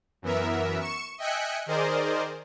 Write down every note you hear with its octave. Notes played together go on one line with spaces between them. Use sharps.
F#2 E3 B3 A#4 E5
C#6 C#7 E7
D#5 E5 G5 G#5 F#6 C#7
D#3 G#4 A#4 C5 D5 D#5